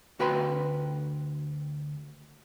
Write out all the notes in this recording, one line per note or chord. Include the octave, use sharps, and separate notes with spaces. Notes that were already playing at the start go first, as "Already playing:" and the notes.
D2 F#4 B4 G5 B5 C6